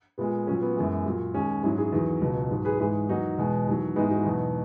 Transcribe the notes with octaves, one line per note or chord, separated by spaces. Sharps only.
A#2 G#3 B3
A#2 F#3 C#4
B3
F#2 E3 G#3
A#2 F#3
D#2 D#3 G#3 C#4
G#2 F#3 C#4 E4
E4 G#4
E2 D#3 F#3
C#2 B2 F#3
G#2 F#3
G#4 B4
G#2 E3 G#3 G#4 B4
E2 D#3 F#3 D#4 F#4
E2 B2 G#3
E2 D#3 F#3
G#2 E3 G#3 B3 D#4
D#4 F#4
E2 B2 F#3